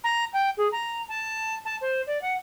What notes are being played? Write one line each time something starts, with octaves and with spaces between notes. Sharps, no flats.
A#5
G5
G#4
A#5
A5
A5
C5
D5
F#5